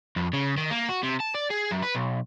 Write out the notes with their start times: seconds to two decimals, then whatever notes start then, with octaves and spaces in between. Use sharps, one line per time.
0.16 F2
0.33 C#3
0.57 D#3
0.71 A#3
0.89 F#4
1.03 C3
1.20 A5
1.34 D5
1.50 G#4
1.71 F#2
1.82 B4
1.95 B1